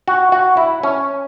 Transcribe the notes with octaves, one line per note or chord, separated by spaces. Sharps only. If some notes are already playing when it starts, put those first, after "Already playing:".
F#4
F#4
E4
C#4